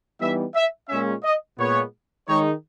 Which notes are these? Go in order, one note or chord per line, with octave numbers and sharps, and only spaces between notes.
E3 G3 B3 D#4 E5
E5
A#2 G#3 C#4 E5
D#5
A#2 G#3 B3 C#5
D#3 G#3 D#4 C#5